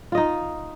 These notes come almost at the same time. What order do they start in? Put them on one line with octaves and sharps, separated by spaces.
F4 D#5 D#4